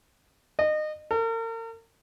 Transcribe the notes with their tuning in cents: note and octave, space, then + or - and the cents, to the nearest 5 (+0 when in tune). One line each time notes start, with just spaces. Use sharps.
D#5 -25
A#4 -40